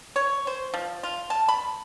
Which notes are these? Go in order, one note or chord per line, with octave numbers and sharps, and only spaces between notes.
C#5
C5
F3
F4
A5
B5